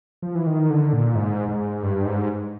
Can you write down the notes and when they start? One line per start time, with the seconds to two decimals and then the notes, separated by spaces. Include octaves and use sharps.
0.22 F3
0.35 E3
0.47 D#3
0.70 D3
0.93 A#2
1.15 G#2
1.49 G#2
1.83 G2
2.05 G#2